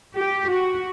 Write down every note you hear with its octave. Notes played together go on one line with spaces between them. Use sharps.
G4
F#4